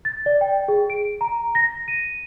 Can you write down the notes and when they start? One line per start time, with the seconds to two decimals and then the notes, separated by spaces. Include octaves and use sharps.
0.05 A6
0.26 D5
0.41 G5
0.68 G#4
0.90 D7
1.21 A#5
1.55 A#6
1.88 D#7